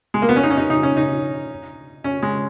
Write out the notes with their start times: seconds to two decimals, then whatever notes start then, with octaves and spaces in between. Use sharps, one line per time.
0.14 G#3
0.22 A#3
0.29 B3
0.36 C#4
0.43 D#4
0.50 C#4
0.57 D#4
0.70 D#4
0.83 C#4
0.97 D#4
2.04 C#4
2.22 G#3